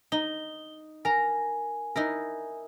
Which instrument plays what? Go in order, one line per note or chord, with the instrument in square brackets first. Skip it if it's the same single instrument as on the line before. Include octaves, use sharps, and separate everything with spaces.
[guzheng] D#4 [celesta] G7
[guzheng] A#4 A#5 [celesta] G#5
[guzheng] D#4 E4 A#4